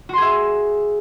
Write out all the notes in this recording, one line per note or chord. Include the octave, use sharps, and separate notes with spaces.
F#4 G#4 E5 C6